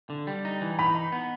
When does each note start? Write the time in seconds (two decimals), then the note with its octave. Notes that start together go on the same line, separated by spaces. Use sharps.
0.10 D3
0.27 G3
0.45 D#4
0.61 E3
0.79 D#4 B5
0.95 D#4
1.12 B3